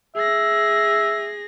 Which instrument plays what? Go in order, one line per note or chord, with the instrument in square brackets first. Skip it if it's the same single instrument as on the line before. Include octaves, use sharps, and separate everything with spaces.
[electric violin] G#4 A#6 [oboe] E5